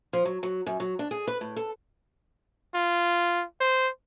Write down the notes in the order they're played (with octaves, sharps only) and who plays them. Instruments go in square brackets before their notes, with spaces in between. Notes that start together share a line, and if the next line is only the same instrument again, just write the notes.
[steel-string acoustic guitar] F3
F#3
F#3
F#2
F#3
D4
G#4
B4
A2
A4
[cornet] F4
C5